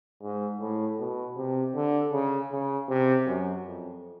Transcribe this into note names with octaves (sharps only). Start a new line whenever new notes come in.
G#2
A2
B2
C3
D3
C#3
C#3
C3
F#2
F2